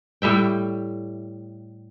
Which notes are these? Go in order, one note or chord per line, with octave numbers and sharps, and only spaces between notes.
A2 G3 E5 G5